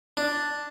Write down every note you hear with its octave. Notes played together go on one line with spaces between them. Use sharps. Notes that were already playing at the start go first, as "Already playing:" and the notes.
D4